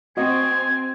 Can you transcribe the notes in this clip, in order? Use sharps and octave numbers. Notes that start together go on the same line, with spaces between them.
C4 F#4 D#5 G#5